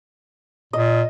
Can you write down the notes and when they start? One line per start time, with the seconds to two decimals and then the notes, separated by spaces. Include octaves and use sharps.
0.73 A#2 D#5